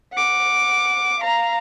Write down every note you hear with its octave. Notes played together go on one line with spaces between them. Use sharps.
F#5 D6
F5 A#5